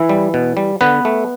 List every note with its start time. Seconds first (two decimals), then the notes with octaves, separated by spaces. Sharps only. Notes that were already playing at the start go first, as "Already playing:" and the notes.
Already playing: E3 E4
0.09 G3
0.34 B2
0.57 G3
0.81 D3 B3 B4
1.05 A3